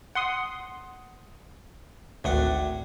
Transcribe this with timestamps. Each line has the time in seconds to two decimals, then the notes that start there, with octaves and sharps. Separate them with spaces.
0.15 F#5 C6 D#6
2.24 G#1 D2 A2 D4 F#5